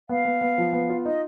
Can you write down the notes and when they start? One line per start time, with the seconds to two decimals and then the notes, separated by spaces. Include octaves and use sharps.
0.09 B3 F5
0.25 B3
0.41 B3
0.58 F3
0.73 B3
0.90 F4
1.05 D#4 D#5